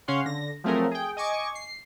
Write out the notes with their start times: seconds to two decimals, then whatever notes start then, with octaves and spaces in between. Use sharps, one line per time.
0.08 C#3 C#4 C#5 F5 F#5 C6
0.25 D3 A#6
0.64 F3 F#3 A3 C4 G#4 A#4
0.91 G#4 G5
1.16 D#5 G#5 C#6 D6
1.55 C7